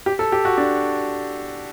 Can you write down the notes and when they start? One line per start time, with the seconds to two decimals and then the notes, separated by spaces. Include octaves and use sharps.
0.06 G4
0.19 A4
0.32 G4
0.45 F#4
0.58 D4